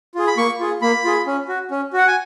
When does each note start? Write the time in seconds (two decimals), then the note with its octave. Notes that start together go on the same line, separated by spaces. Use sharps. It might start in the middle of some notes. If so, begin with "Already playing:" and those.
0.15 F4 G#4
0.27 B5
0.37 A#3 C#6
0.60 F4 G#4
0.82 A#3 B5
1.04 F4 G#4
1.27 C#4
1.48 F#4
1.71 C#4
1.93 F#4 F#5
2.07 G#5